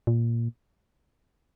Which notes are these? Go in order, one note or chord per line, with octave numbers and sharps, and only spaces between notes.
A#2